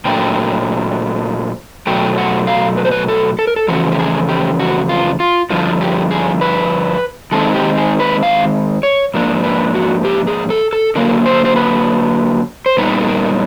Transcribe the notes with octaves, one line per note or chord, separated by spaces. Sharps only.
A#2 F#3 A3 D4 G5
B2 F#3 A3 G5
F#5
F5
B4
C5
B4
A4
A4
A#4
A4
F2 C#3 E3 A3 F#4
G4
G#4
G4
F#4
F4
F4
G2 D3 F3 F4
G4
G#4
B4
D#3 G#3 C4 D#4 A4
G4
G#4
B4
F5
C#5
G#2 F3 A#3 D4
B4
F#4
G4
G#4
A4
A4
D3 F#3 A#3 A#4
C5
C5
B4
C5
A#2 G3 B3 D#4 B4
A4
A#4